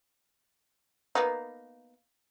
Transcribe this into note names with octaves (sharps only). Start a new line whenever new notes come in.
A#3 B3 D#4